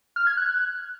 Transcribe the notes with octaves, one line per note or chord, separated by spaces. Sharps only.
F6
G#6
F#6